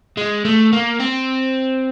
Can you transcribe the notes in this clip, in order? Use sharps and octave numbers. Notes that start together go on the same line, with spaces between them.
G#3
A3
A#3
C4